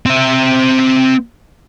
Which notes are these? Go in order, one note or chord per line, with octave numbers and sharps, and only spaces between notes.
C4 E5